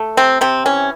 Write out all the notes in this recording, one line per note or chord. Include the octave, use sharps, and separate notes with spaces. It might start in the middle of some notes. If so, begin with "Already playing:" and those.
Already playing: A3
C3 C4
C3 C4
E3 C#4